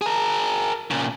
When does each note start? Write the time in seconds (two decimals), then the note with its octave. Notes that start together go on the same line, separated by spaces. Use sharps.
0.01 G#4 A#4
0.91 A#2 C#3